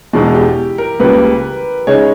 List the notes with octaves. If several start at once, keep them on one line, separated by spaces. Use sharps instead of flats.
E1 E2 B2 G#3 E4
G4
A#4
C#2 C#3 G3 A#3 B4
C#3 G#3 D#4 C#5